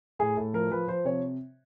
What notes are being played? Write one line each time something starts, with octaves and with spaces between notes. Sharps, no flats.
A2 G#4
A2 A4
F3 A#4
F3 B4
F3 C5
C3 C#5